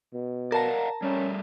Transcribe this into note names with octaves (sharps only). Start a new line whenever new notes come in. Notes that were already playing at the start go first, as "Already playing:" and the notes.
B2
A#4 D5 F5 F#5 A5 A#5
G3 A3 C#4